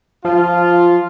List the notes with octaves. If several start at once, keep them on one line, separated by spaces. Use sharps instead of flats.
F3 F4